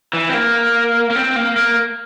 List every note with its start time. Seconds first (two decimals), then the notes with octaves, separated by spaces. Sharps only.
0.13 E3
0.29 C4
0.34 A#3
1.10 A#3
1.16 C4
1.36 A#3
1.56 A#3